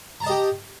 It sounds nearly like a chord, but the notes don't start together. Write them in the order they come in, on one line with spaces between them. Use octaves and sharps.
A#5 A5 D#5 G4